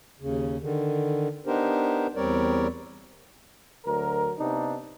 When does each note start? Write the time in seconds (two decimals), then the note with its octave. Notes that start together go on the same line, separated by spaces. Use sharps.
0.21 D#2 C#3
0.61 D3 D#3
1.46 B3 D4 D#4 G4 A#4 C5
2.16 E2 G3 C4 A#4 C#5 D5
3.85 D2 F#3 A#4
4.38 C3 B3 D4 D#4